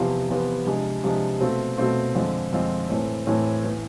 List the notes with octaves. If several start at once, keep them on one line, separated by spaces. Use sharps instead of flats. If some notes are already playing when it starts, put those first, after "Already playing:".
Already playing: E2 C3 F3 B3 F4
E2 C3 F3 B3 F4
C3 F3 G#3 D4
C3 F3 G#3 D4
B2 A3 C4 F4
B2 A3 C4 F4
F2 D3 G#3 C4 F4
F2 D3 G#3 C4 F4
A2 E3 A3 C4
A2 E3 A3 C4
E3 B3